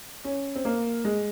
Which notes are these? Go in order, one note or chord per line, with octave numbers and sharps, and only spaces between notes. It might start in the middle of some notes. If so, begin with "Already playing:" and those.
C#4
C4
A#3
G#3